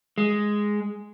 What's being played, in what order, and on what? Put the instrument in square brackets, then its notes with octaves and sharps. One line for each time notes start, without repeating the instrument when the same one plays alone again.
[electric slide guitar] G#3